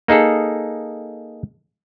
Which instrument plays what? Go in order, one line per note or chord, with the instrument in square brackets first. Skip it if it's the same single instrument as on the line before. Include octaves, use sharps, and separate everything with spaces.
[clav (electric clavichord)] A#3 D#4 G#4 A4